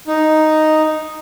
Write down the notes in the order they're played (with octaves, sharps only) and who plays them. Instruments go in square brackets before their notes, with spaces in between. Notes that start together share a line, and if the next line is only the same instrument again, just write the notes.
[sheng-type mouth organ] D#4